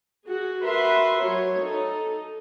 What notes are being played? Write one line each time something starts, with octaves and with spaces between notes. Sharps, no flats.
F#4 G#4
F#4 A#4 B4 E5 C6
F#3 C#5
D#4 A4